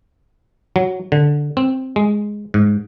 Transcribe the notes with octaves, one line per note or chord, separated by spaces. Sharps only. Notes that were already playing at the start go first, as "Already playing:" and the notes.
F#3
D3
C4
G#3
G#2